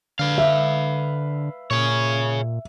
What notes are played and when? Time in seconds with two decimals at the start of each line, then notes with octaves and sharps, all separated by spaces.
0.19 D3 B4 F5
0.38 E5
1.71 A#2 G#4 C#5